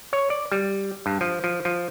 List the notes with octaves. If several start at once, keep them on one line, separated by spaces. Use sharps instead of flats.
C#5
D5
G3
G2
F3
F3
F3